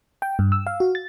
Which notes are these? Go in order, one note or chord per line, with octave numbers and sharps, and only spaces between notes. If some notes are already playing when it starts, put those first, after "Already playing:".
G5
G2
E6
F5
F#4
A6